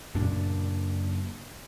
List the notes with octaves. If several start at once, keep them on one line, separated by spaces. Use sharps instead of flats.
F#2 A#2 C#3 D4